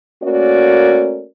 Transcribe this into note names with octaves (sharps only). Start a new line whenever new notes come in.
A3 A#3 C#4 F#4 A#4 D5